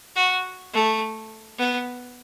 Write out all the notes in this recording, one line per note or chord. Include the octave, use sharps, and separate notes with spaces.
F#4
A3
B3